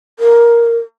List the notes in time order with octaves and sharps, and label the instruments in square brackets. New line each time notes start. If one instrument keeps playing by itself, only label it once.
[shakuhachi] A#4